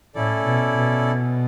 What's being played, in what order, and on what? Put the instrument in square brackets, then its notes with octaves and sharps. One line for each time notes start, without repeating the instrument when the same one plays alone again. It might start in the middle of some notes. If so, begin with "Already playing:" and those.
[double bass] A2 [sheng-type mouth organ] C#4 E4 A4 D5
[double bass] B2
B2